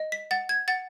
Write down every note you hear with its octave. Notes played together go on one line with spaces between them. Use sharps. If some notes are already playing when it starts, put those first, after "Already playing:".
Already playing: D#5
B6
F#5 A6
G#6
F#5 A6